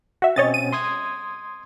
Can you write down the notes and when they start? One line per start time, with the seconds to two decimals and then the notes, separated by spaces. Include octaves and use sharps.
0.22 F#4 E5
0.36 B2 C4 C#4 C#5 D#5 A6
0.54 D#7
0.73 C6 D#6 G#6